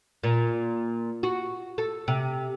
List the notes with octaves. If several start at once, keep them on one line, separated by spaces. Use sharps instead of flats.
A#2
F#4
A4
C3